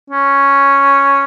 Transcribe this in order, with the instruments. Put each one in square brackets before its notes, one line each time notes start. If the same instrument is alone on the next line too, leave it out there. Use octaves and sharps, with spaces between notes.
[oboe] C#4